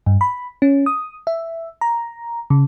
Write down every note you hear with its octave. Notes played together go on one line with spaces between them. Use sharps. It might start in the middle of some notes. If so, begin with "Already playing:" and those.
G2
B5
C#4
D#6
E5
A#5
C#3